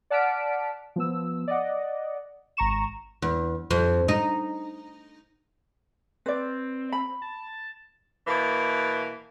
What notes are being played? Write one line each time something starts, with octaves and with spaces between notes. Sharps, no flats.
D5 F#5 A5 F6 B6 D7
F3 B3 E6
D5 D#5 F#5
G#1 A#5 C#6 E7
E2
F2
D#4
C4 B4 D5
B5
A5
B2 E3 A#3